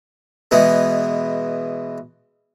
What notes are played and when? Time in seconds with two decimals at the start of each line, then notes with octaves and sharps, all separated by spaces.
0.51 B2 E3 G#3 B3